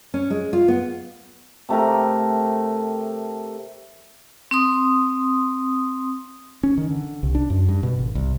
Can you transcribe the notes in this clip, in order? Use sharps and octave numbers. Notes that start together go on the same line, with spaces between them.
C#4
G#3
F4
B3
C3 A3 G4 A#4
C4 C6 D#6
C#4
D#3
D3
C2
D4
F#2
G2
B2
G#1
C2